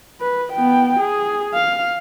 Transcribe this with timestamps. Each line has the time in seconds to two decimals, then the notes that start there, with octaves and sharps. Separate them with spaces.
0.21 B4
0.53 B3 G5
0.99 G#4
1.54 F5